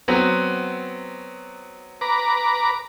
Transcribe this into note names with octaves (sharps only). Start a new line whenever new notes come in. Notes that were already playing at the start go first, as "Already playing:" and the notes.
F#3 B3 C4
B4 A#5 D6